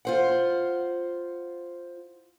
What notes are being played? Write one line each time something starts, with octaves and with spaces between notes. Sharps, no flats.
F4 C5 F#5